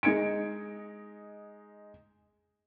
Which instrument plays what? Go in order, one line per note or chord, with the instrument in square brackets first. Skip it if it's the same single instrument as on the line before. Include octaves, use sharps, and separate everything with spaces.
[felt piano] G#3 D#4 G#6 C#7 D7